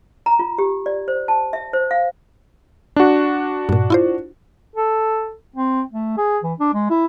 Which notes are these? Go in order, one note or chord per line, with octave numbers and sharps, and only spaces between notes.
A#5
F4
G4
D5
C5
A5
E5
C5
F5
D4 F#4
G2 A#2
E4 F4 C5
A4
C4
A3
G#4
E3
D4
G#3
E4